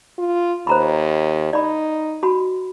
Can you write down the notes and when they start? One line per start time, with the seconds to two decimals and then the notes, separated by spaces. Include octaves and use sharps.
0.19 F4
0.67 D#2 C5 A#5 B5
1.53 D#4 D5 B5
2.23 F#4 B5